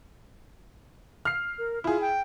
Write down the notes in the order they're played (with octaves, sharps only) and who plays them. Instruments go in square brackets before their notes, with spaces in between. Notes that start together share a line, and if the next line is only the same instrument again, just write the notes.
[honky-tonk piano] F6 C7
[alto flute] A#4
[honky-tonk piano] E4 G#4 [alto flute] F4
[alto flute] G5